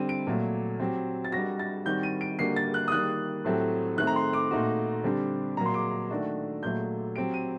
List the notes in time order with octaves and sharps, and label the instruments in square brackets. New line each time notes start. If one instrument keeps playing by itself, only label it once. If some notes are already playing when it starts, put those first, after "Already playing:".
Already playing: [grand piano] D3 G3 C4 [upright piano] D#7
[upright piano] D7
[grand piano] A#2 F#3 A3
F#3 C4 G4
[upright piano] A6
[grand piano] G3 D4 F#4 [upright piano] A#6
[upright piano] A6
[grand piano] D#3 G3 C4 F#4 [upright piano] G6
[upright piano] D#7
D7
[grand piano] D3 G3 A#3 F#4 [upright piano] C7
[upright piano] A6
F#6
D#6
[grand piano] D#3 G3 A#3 [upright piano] F#6
[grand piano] A2 F#3 A3 C4 G4
[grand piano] D#3 A3 C4 [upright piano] F#6
[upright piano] A#5
C6
D6
[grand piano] A#2 A3 D#4 F#4
D3 G3 C4 G4
[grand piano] A#2 F#3 A#3 [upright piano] A#5
[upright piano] C6
D6
[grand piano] D#3 A3 D4 F#4
[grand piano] A#2 F#3 A3 [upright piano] G6
[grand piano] F#3 C4 G4 [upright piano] D7
[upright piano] D#7